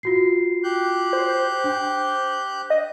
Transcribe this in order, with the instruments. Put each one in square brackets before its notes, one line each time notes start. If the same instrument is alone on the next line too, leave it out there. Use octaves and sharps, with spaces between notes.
[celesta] F4 F#4 C7
[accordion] G4 F#6 G6
[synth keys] C5
[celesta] D4
[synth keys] D#5